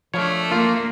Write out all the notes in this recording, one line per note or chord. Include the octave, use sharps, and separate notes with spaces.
F3 A3 D4 C#5
A#3 F4